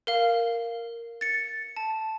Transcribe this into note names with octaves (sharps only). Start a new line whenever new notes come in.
A#4 F5
A6 C#7
A5